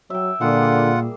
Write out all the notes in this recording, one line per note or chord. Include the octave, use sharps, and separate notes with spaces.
F#3 E5 G5
A#2 D3 G3 A#3 F4 G#4 F#5